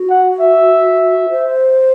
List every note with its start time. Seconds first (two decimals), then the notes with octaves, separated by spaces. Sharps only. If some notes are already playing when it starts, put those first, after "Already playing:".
Already playing: F#4
0.10 F#5
0.40 E5
1.30 C5